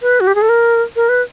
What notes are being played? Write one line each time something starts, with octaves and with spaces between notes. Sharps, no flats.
B4
F#4
G4
G#4
A4
A#4
A#4
B4